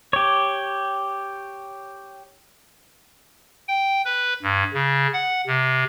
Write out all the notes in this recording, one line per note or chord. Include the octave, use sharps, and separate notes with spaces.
G4 C#5
G5
B4
G2
C#3
F#5
C3